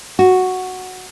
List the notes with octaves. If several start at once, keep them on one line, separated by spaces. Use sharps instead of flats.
F#4